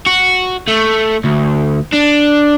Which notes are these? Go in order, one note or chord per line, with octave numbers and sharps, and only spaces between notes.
F#4
A3
D2
D4